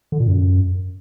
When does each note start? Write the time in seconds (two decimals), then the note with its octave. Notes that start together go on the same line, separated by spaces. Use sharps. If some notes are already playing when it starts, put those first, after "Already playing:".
0.12 D3
0.20 A#2
0.28 F#2